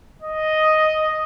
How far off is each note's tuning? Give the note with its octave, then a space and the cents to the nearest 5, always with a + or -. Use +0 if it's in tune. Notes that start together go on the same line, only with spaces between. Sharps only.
D#5 +0